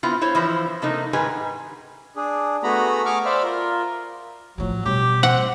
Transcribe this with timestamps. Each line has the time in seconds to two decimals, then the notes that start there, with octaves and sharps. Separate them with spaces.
0.03 B3 C4 E4 F4
0.21 E4 C5 C#5
0.35 E3 F3 C5 E5
0.82 C3 A3 A#3 D#4
1.13 G#2 D#3 G#4 B4 G#5
2.16 D4 G#4
2.63 A3 B3 F#4 G#4 A#5 B5
3.05 G#4 C#6 D6 F6
3.25 C5 D5 E5 F5 B5
3.43 F4 A#4
4.58 A2 F3 F#3
4.85 B2 G3 G4
5.23 C4 F#5